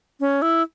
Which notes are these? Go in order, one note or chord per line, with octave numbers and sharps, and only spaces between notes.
C#4
E4